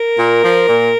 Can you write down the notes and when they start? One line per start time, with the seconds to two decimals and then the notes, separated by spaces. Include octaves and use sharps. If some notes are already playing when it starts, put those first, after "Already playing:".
Already playing: A#4
0.17 A#2
0.43 F3
0.68 A#2